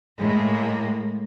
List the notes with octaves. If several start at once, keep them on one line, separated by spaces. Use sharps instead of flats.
A2 G#3 A#3